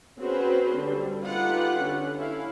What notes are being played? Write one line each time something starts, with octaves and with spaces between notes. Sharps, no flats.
C4 C#4 F#4 G#4 B4 C5
D3 G3
D#4 F4 G4 A4 B4 F#5
D3 C#4
C#4 E4 F5